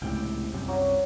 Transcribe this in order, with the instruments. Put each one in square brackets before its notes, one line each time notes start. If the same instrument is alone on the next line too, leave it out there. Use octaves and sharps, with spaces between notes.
[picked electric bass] C#2 A2 C3 [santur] G5
[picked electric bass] C2 F#2 C3
[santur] F#3